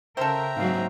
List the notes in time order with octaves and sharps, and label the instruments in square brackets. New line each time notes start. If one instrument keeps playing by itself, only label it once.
[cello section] C#3 A#4 [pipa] A4 C5 [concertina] E5 G5 A#5
[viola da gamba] G#2 F#3 [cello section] A#3 C4 F5